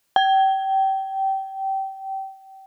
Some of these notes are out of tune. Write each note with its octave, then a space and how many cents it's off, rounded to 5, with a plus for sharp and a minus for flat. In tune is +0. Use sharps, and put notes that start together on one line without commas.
G5 -25